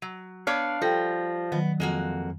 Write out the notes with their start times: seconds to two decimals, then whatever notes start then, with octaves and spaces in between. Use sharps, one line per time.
0.02 F#3
0.47 B3 D4 C#5 D5 F5
0.82 F3 G3 A4 G5 A#6
1.52 D#3 F#3 B3
1.80 F2 G#3 A#3 F#4